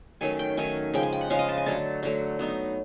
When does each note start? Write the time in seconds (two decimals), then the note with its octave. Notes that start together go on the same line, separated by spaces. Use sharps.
0.21 D#3 F#3 A3 C#4 G#5
0.39 G5
0.57 D#3 F#3 A3 C#4 G#5
0.94 C#3 F3 G#3 G5
1.03 G#5
1.13 G5
1.21 F#5
1.30 C#3 F3 G#3 F5
1.39 D#5
1.49 A5
1.58 G#5
1.66 D3 F#3 A3 A5
2.03 D3 F#3 A3
2.39 F#3 B3 D#4